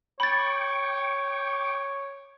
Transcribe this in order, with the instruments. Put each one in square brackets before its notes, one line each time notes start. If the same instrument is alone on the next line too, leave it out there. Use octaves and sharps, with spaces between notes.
[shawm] C#5 [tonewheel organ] G5 C#6 D6 [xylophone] B5 A6